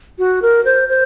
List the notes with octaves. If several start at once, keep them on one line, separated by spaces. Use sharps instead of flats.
F#4
A#4
C5
C5